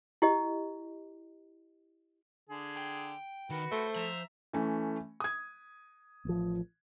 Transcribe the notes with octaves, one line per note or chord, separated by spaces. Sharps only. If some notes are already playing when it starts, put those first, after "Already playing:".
E4 G4 D#5
D3 G#4
G5
D#3 F#4 B4
A3 C5
F3 E5 A#5
E3 A3 C#4
D#6 G#6
A1 F3